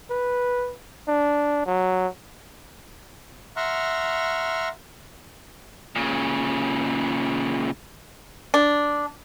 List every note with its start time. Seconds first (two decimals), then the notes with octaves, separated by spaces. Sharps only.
0.10 B4
1.08 D4
1.66 F#3
3.56 E5 F#5 A#5 C6 C#6 F6
5.96 A#2 C#3
8.54 D4